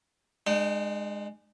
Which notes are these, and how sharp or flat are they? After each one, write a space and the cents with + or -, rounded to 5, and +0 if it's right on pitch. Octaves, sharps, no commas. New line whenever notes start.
G#3 +0 D4 +45 G5 -20